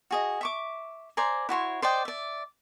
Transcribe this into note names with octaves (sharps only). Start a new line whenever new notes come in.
F#4 G#4 D#5
E5 C#6 D6
C5 D5 G#5 A#5
E4 F#4 C#5 C6
C5 D5 D#5 G5
D5 E5